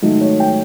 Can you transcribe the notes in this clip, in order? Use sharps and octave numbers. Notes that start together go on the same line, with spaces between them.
G#2 D#3 F#3 A3
C#5
G5